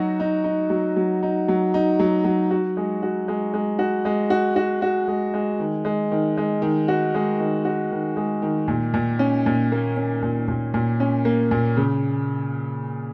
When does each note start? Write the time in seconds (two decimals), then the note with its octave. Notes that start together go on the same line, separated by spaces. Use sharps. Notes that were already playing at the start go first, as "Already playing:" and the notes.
Already playing: F#3 D#4 F#4
0.20 D#4
0.44 D#4
0.70 F#3
0.96 F#3
1.23 D#4
1.48 F#3
1.74 D#4
2.00 F#3
2.24 F#3
2.51 F#4
2.77 G#3
3.02 F#4
3.28 G#3
3.54 G#3
3.79 F#4
4.05 G#3
4.30 F#4
4.56 F#4
4.82 F#4
5.08 G#3
5.34 G#3
5.60 D#3
5.85 G#3
6.12 D#3
6.37 G#3
6.62 D#3
6.88 F#4
7.15 G#3
7.40 D#3
7.65 F#4
7.91 D#3
8.17 G#3
8.42 D#3
8.68 A#2
8.94 A#2
9.19 C#4
9.46 A#2
9.72 A#3
9.97 C#4
10.22 A#2
10.48 A#2
10.74 A#2
11.00 C#4
11.25 A#3
11.51 A#2
11.77 C#3